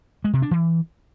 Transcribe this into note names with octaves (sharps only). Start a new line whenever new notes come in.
G#3
C3
D4
E3